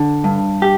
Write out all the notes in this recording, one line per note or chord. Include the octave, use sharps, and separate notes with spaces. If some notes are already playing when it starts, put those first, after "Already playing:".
Already playing: D3
G2
G4